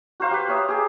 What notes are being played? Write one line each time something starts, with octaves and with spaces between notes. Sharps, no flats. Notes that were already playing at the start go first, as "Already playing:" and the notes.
F#4 A#4 C5 F5
G4 B4
A#4 C#5 E5 D#6
G4 G#4